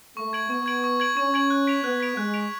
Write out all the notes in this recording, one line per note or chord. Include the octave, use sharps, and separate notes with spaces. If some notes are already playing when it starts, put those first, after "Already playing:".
A3 C#6
G#6 D7 F#7
B3 C#6
G#6 D7 F#7
C#6
G#6 D7 F#7
C#4 C#6
G#6 D7 F#7
F#6
B6 D7 F7
B3 F#6
B6 D7 F7
G#3 F#6
B6 D7 F7